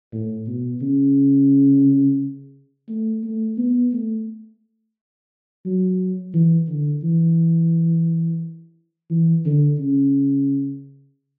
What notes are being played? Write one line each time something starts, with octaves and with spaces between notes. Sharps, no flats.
A2
B2
C#3
A3
A3
B3
A3
F#3
E3
D3
E3
E3
D3
C#3